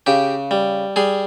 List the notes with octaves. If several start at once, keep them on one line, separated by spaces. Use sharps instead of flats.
C#3 G4
G3
G3 G#4